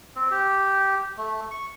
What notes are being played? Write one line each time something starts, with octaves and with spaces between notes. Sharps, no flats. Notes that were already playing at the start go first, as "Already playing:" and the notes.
C4
G4
A3
C#6